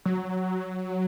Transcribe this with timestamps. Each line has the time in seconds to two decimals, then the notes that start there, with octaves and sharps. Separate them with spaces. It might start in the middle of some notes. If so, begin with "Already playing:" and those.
0.05 F#3